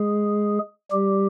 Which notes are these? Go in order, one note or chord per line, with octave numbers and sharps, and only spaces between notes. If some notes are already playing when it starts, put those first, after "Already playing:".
Already playing: G#3 G#4
G3 G4